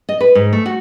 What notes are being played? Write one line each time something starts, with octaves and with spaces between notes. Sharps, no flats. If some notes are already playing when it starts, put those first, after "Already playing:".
D#5
B4
G#2
A3
F#4